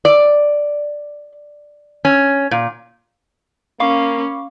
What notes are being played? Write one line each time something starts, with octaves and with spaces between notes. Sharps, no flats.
D5
C#4
A#2
A#3 C#4 F5 B5 C#6 D6